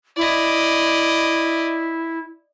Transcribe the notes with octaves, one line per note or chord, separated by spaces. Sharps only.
E4 D5 D#5